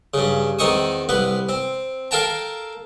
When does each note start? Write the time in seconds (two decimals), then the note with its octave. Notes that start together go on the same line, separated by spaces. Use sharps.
0.14 G2 C#3
0.59 E2 D#3 C4 D#4 C#6 D#6
1.09 C2 B3 B4
1.49 C4
2.11 A4 A#4 F5 G5 A5 A#5